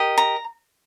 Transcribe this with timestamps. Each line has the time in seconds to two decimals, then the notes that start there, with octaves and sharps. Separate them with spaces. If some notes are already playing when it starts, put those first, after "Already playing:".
Already playing: G4 A#4 D#5
0.18 A#5